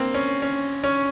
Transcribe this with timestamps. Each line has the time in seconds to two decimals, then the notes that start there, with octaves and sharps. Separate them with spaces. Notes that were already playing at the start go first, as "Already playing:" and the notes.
Already playing: A#3 C4
0.14 C#4
0.42 C#4
0.84 C#4